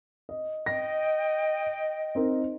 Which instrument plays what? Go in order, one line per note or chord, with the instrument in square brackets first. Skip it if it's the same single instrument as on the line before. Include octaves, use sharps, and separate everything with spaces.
[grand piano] D#5
[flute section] D#5 G5 [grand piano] A#6
[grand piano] C4 D#4 A#4